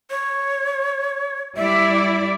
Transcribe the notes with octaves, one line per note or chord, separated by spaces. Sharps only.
C#5
G3 E4 D5 E5